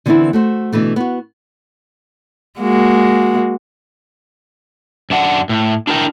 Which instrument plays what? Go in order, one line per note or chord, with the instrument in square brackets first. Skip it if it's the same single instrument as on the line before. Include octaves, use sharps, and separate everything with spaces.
[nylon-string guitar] D3 E3 B3 C4 D4 E4
A3 F#4 C5
B2 D3 E3 A3
B3 F#4
[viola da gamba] G#3 A#3 F#4
[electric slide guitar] F#2 D4 F#5
A2
D4 E4 A#4 G5